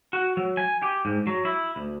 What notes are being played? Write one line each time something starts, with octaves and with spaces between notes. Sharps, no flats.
F#4
F#3
G#5
G4
G#2
F#3
E4
D2